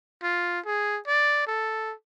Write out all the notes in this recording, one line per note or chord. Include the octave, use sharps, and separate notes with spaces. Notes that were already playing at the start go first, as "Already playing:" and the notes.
F4
G#4
D5
A4